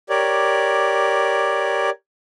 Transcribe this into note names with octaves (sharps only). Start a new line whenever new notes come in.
G4 A#4 C#5 D5